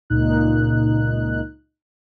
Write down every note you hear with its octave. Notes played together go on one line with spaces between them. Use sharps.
C#2 A#2 D#4 F#6